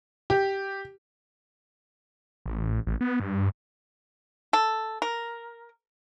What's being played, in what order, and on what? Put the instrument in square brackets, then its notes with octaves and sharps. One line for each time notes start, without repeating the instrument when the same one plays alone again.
[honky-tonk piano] G4
[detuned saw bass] A1
A1
B3
G2
[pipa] A4
A#4